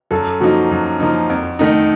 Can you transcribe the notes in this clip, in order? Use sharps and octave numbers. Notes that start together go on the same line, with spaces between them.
F#2 A4
F3 A#3 D#4 F#4
F#2
F3 A#3 D#4
F2
D#3 A3 D#4